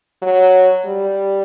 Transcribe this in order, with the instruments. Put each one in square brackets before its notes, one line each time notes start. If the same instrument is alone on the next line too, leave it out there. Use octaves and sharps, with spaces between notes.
[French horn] F#3
G3